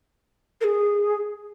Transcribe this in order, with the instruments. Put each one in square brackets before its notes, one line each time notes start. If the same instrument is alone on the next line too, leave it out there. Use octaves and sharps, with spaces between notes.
[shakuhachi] A#4
G#4